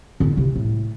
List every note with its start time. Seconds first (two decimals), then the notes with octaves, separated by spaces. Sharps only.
0.20 D3 E4
0.37 C3
0.56 A2